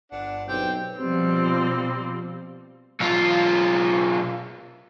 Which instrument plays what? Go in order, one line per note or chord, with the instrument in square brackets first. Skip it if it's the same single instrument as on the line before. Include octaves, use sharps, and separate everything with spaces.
[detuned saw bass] G1 [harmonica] D4 F#5
[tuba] B1 [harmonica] C4 G4 [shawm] G5
[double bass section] B2 F3 [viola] G3 C4
[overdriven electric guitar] B1 F4